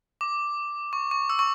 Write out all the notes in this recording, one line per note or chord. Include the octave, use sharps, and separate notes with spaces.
D6
C#6
C#6
E6
C#6